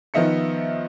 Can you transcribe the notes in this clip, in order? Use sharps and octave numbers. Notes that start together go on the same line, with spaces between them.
D#3 F3 B3 D#5 E5 C#7